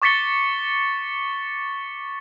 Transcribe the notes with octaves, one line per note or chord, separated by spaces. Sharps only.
C#6 D6 A6 B6 C#7 G7